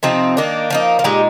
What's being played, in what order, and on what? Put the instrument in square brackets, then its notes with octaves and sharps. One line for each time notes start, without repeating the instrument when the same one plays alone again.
[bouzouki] C3 F3 C4 D#4
D#3 A#3 D4
F3 A#3 D#4
F4
A#2 G#3 D#4 G4